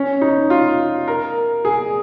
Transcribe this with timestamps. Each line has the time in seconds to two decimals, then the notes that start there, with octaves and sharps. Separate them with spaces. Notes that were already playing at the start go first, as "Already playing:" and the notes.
Already playing: C#4
0.21 D#4
0.50 F4
1.08 A#4
1.65 G#4